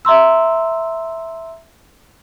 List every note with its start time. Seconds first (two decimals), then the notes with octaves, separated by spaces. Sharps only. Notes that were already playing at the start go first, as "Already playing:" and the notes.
0.05 E5 A#5 C6 E6